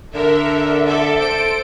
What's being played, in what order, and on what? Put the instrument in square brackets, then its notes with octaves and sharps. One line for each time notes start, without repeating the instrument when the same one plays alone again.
[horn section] D3 [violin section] A4 E5 [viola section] A#4
[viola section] A4 [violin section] E5 D6
[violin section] C5 D7